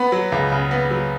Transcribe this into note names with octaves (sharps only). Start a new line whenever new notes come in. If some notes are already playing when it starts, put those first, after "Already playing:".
Already playing: B3 B5
F#3
C#2
C#3
B3
F#3